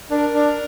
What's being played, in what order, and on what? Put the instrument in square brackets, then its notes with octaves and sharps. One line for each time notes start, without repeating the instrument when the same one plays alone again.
[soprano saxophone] D4 [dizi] A#4
[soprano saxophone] D4